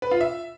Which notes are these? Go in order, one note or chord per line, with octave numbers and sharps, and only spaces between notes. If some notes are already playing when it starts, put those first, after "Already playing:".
B4
F4
E5